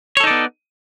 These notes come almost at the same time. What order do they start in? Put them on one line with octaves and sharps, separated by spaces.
C#5 A4 D#4 D5 B3